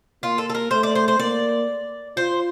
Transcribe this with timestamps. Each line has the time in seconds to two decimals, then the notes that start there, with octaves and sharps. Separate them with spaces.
0.23 A#3 F4
0.38 A4
0.49 A4
0.55 A#4
0.71 A3 C5
0.83 D5
0.95 C5
1.08 C5
1.19 A#3 D5
2.17 F4 C5